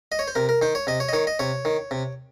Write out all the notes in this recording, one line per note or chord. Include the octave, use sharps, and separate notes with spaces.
D#5
C#5
C5
C3 A#4
A#4
D#3 C5
C#5
C3 D#5
C#5
D#5
D#3 C#5
D#5
C3 C#5
D#3
C3